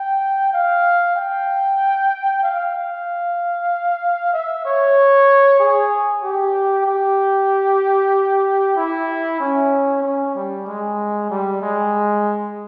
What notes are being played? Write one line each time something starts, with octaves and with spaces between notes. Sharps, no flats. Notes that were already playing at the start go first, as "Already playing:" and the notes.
Already playing: G5
F5
G5
F5
F5
E5
C#5
G#4
G4
G4
E4
C#4
C#4
G3
G#3
G3
G#3